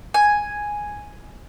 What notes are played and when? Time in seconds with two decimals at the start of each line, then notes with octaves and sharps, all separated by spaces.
0.14 G#5